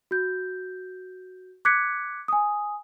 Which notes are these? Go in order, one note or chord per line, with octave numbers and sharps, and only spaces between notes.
F#4 G6
D6 F#6 G#6 B6 C#7
G#5 D#6